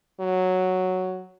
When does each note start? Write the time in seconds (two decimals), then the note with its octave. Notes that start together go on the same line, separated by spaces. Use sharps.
0.20 F#3